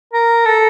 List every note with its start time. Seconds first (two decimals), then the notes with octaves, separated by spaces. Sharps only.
0.13 A#4
0.45 A4